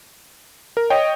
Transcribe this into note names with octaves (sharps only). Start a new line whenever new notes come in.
A#4
C#5 D#5 G5